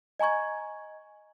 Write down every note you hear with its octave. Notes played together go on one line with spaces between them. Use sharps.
D#5 G#5 A#5 C#6 G#6